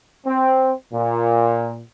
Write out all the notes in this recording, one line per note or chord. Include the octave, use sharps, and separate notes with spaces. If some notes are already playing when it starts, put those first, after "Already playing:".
C4
A#2